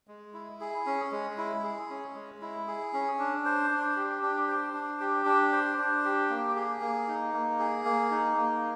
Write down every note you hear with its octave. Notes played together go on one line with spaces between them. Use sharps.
G#3
E4
G#4
C#4
G#3
E4
G#4
C#4
G#3
E4
G#4
C#4
D4
C5
D4
G4
D4
C5
D4
G4
D4
C5
D4
G4
A#3
G#4
A#3
D#4
A#3
G#4
A#3
D#4
A#3